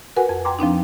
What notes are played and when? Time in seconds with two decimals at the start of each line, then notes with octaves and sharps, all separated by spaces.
0.16 F#4 A#4 B4 F#5 G#5
0.29 F2
0.45 G5 A#5 C6 D6
0.59 F3 C4 D4 D#4